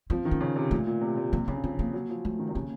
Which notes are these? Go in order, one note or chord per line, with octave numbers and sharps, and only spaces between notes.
F3 C4
D#3
C#4
C#3
C3
A#2 A3
A#2
C3
C3
C3 A#3
C#3 C#4
F3 C4
A#3
F#3
F3
F3 A3
D#3
C3
C#3 A#3